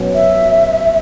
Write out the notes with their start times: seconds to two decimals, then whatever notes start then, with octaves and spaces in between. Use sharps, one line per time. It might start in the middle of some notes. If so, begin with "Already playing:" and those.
Already playing: B2 F#3 C#4
0.15 E5